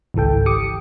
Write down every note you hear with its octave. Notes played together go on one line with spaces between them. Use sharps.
G#1 C#2 E3 A4 G5
G4 D6 D#6 C#7